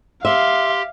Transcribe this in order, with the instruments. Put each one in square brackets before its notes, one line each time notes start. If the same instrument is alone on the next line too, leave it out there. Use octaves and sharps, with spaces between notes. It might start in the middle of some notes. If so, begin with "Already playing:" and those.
[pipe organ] G4 [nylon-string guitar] E5 [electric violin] F5 [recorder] C6